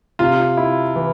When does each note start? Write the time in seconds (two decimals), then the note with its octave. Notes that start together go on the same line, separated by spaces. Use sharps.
0.19 C3 F4
0.57 E4
0.96 E3